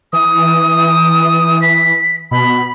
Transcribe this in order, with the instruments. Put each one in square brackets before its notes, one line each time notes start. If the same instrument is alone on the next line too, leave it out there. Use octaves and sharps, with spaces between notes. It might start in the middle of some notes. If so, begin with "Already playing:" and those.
[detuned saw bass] E3 [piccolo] D#6
[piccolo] B6
[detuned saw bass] B2 [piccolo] B5